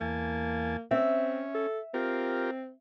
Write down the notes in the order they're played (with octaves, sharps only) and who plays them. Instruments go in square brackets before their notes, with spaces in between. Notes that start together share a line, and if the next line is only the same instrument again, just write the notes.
[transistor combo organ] E2 G#5 A5 [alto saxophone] A#3
[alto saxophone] C4 [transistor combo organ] C#4 [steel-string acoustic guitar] E5
[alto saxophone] A4
[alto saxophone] C4 [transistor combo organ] F4 G4 A#4